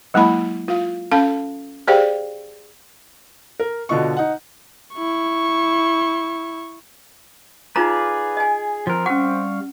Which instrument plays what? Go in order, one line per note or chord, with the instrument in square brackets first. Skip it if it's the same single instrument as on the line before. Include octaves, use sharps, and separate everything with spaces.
[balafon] F#3 G#3 A#3 E4 B5
F4 F5
C#4 A4 F5 A5
G4 G#4 C5 D5 F5 G5
[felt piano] A#4
B2 D3 F4 D#5 C#6
D#4 F#5
[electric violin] E4 C#6
[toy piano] D#4 F4 A#5 [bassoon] G#4 [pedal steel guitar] B4 D5 F5
[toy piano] D#5 G#5
[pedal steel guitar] F3 A#4 [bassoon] C4
[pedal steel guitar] G3 F5 C#6 [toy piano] C#4 F#5